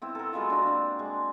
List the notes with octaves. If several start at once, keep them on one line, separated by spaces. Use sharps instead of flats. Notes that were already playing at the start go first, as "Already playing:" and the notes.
B3 C4 E4
A4 A#4
F#3 G#3 B3 F4
D4 F#4
A#3 C4
G#3